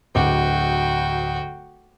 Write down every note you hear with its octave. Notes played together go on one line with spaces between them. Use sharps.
D1 D2 F#4 G5 D6